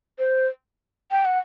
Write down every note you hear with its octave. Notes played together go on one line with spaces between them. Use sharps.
C5
G5
F#5